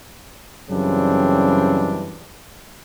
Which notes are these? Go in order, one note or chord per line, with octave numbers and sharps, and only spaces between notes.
F#2 C#3 E3 G3 C4 D4